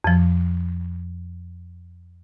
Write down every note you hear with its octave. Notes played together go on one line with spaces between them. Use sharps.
F2 F3